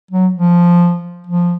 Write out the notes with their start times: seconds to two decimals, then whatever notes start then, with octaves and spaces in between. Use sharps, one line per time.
0.11 F#3
0.34 F3
1.27 F3